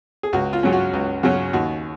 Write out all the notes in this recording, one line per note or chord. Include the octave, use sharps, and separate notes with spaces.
G#4
C#2 F#4
F4
C#3 F#3 C#4
F#4
C#2
C#3 F#3 C#4 F#4
D#2 F#4